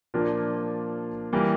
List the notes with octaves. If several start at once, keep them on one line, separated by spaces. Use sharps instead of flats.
A#2 F3 A#3 D4 F4
E3 G3 A#3